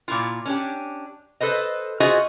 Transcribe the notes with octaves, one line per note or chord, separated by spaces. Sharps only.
A#2 E4 F4
C#4 D4 G4
A4 B4 C5 D#5
F4 F#4 G#4 C5 D#5 E5